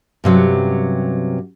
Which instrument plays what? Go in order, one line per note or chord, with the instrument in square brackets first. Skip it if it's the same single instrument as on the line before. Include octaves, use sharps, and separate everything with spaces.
[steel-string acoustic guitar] G2 C3 F#3 C#4